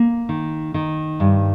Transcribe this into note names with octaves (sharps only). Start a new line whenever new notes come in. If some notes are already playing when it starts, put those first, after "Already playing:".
Already playing: A#3
D#3
D#3
G2